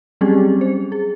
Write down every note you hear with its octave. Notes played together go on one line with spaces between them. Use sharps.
F#3 G3 C4 C#4 G4 G#4
C5
G#4